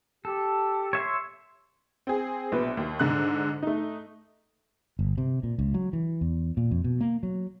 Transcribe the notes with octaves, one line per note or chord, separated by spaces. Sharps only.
G4 A4
C#5 E5 C6
C4 G#4
A#1 B2 B4
D#2
G#2 D3 F#6
A3 D#4
G1
C3
A#2
C#2
F#3
E3
E2
A#2
F2
B2
A#3
F#3